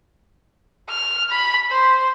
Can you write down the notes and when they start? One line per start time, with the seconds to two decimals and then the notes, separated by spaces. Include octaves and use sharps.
0.89 F6
1.30 B5
1.70 C5